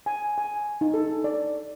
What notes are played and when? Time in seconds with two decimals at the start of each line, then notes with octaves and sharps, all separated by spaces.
0.06 G#5
0.38 G#5
0.81 D#4
0.94 A4
1.24 D5